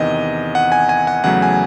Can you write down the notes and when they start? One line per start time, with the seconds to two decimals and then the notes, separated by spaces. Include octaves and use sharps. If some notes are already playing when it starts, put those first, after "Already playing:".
Already playing: E2 C3 D#3 D#5
0.55 F#5
0.72 G#5
0.89 G#5
1.07 F#5
1.24 E2 C#3 F#3 A3 F#5
1.42 G#5